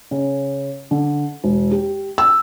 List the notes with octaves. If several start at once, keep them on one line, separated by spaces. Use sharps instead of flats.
C#3
D3
E1
G4
E6